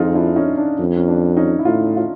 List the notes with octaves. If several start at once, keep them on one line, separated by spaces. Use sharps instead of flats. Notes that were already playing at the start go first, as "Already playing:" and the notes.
Already playing: F2 D#4 F4 G#4
D4 E4
C#4 D#4
D4
F2
C#4
D4
C#4 D#4
E4
A2 D#4 F4
F4